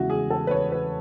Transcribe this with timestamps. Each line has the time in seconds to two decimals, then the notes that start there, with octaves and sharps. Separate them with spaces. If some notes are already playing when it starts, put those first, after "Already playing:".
Already playing: E2 C#3 G#3 E4 F#4
0.10 G#4
0.30 A4
0.47 B4
0.51 C#5
0.72 B4